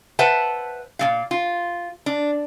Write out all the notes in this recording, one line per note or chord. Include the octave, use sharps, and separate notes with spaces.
B4 C5 E5 F#5 A5
A#2 A3 F5
F4
D4